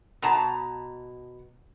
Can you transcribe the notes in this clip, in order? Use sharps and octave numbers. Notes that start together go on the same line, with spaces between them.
B2 A5 A#5